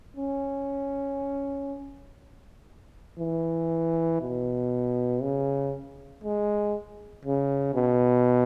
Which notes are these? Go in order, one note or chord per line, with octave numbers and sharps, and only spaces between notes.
C#4
E3
B2
C#3
G#3
C#3
B2